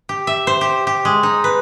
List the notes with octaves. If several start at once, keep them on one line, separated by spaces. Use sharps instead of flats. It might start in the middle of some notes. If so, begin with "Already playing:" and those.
G4
E5
C5
G4
G4
G#3
D#4
B4